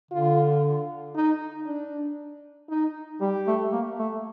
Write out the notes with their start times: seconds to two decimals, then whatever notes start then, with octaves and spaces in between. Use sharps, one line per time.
0.11 D3 F4
1.15 D#4
1.66 D4
2.69 D#4
3.21 G3 G4
3.47 A3
3.72 A#3
3.99 A3